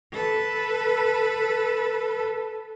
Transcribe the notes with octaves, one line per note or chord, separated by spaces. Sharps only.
A4 B4